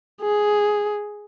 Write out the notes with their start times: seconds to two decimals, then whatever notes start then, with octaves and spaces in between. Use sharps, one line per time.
0.22 G#4